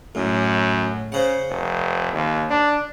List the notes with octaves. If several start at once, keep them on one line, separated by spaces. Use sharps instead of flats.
F#2 A2
C#3 C5 F#5
F1
D#2
D4